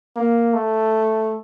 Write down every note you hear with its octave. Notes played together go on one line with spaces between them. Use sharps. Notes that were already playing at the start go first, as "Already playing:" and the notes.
A#3
A3